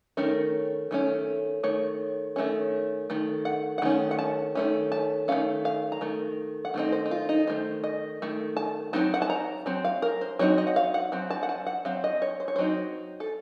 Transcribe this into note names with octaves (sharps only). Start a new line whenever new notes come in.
D#3 A3 C#4 A#4
D#3 A3 C#4
D#3 A3 C#5
D#3 A3 C#4
D#3 A3
F#5
F#5
D#3 A3 C#4
F#5
A5
D#3 A3 C#4
A5
D#3 A3 C#4 F5
F5
A#5
D#3 A3
F#5
D#3 A3 C4 D#4
C5
D#4
F4
D#4
D#3 A3 C5
D#5
D#3 A3
A5
F#3 C4 D#4 A5
F#5
A5
A#5
F#3 C4
F5
A#4
C5
F#3 C4 D#4 C#5
D#5
F#5
F5
F#5
F#3 C4
A5
F#5
A5
F#5
F#3 C4 F5
D#5
C#5
C5
C#5
F#3 C4 D#4 C5
A4